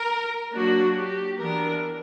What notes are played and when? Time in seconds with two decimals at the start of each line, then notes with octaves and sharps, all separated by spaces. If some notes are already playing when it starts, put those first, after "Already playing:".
Already playing: A#4
0.53 F#3 A#3 D4 F#4
0.96 G4
1.40 E3 B3 D4 A#4